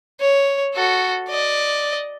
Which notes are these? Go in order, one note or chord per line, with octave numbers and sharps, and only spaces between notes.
C#5
F#4 A4
D5 D#5